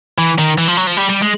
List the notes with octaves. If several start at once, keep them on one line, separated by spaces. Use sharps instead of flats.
E3
D#3
E3
F3
F#3
F3
G3
G3
G#3